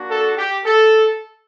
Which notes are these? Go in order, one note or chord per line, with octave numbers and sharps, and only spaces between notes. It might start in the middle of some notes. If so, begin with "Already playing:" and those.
Already playing: A#3 D4 F#4
A4
G4
A4